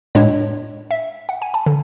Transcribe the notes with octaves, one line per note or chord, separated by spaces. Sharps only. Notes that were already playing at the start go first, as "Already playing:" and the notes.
A2 G#3 D4 C#5
E5
F#5
G#5
A5
D3